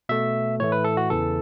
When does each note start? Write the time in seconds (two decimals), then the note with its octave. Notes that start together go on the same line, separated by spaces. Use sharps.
0.09 B2 A3 E5
0.60 A2 E3 A3 C#5
0.72 B4
0.84 A4
0.97 F#4
1.10 E2 C#3 E3 A4